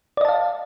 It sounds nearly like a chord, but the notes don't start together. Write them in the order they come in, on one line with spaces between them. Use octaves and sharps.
D5 D#5 A5 F5